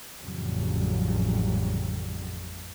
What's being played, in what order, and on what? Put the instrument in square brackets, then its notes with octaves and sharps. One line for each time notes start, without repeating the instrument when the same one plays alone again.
[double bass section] A1 F2 A2 C#3 F#3 G3